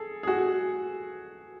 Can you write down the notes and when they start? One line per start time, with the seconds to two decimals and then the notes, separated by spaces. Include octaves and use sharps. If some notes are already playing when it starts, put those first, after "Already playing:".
Already playing: G#4 A4
0.23 G#4
0.27 F#4